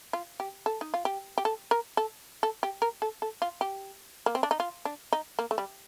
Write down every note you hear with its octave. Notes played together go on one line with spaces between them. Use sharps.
F4
G4
A4
D#4
F4
G4
G4
A4
A#4
A4
A4
G4
A#4
A4
A4
F4
G4
A#3
C4
D4
D#4
F4
D4
D#4
A#3
A3
G3